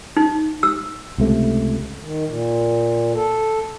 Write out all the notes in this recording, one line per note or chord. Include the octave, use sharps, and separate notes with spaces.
D#4
E6
C#2 C3 A3
D#3
A#2
A4